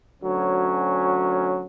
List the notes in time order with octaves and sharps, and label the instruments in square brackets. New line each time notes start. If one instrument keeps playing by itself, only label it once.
[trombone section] D2 F#3 C#4